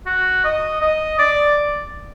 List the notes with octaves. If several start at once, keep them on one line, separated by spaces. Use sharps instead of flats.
F#4
D#5
D#5
D5